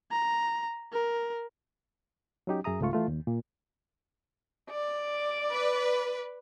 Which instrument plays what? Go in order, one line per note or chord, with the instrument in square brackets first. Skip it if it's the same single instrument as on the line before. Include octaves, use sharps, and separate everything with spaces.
[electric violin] A#5
A#4
[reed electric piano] F#3 C#4 D#4 G4
F#2 G#4 E5 A#5 D#6
C#2 G#2 A3 F4 C#6
E3 A3 F4
D#2
A#2
[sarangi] D5
[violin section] B4